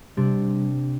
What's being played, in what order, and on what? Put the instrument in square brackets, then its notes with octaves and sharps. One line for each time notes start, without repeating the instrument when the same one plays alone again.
[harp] C3 D4 [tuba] G3